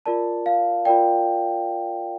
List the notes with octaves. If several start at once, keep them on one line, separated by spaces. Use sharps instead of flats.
F4 A#4 D5 A5
F5
F4 A#4 D5 G5